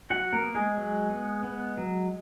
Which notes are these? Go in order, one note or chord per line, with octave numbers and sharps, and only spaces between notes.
F#3 F#4 F#5
A#3 A#4
B3
G#3 G#4
F#3
B3
B3
F#3